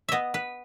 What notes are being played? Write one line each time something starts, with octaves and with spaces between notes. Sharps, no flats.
B3 D#5 E5
B4